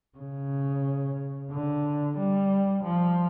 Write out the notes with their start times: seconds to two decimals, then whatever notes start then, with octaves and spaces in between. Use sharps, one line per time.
0.18 C#3
1.52 D3
2.18 G3
2.84 F3